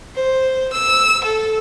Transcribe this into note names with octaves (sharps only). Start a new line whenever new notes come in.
C5
E6
A4